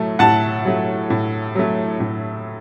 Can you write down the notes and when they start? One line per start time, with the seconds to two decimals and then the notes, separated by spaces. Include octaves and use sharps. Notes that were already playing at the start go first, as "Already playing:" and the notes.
Already playing: A2 F#3 A3
0.19 A2 F#5 A5
0.65 F#3 A3
1.10 A2
1.55 F#3 A3
2.00 A2